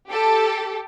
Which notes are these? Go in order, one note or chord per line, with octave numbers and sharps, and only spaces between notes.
G4 A4